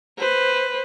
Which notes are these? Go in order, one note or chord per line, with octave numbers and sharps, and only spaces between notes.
B4 C5